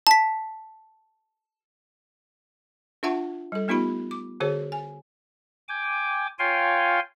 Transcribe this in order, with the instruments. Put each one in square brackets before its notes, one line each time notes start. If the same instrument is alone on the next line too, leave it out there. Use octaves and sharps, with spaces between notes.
[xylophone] A5 B6
[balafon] D4 F4 E5 F#5 A5 C#6
G3 A4
A3 B3 D#4 F4 G4 B5
D6
D3 F#4 G#4 C5 C#5
G#5
[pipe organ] G5 G#5 D6
F4 C#5 F5 G5 G#5 C6